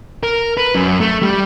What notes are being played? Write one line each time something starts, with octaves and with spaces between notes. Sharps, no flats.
A#4
B4
F#2
A3
G3